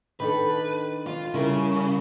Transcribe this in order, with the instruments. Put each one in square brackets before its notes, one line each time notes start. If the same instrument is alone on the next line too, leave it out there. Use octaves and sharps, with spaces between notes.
[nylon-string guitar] D#3 D4 A4 [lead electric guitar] B4
[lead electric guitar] F4
[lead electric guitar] C#3 [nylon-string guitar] G3 E4 A#4